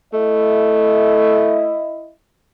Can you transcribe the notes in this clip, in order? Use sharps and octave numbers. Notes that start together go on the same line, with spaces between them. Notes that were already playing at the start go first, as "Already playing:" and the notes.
A3 E4 D#5